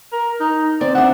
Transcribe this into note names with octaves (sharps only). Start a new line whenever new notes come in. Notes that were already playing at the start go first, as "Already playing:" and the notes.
A#4
D#4
C4 D5
D4 C5 E5 F#5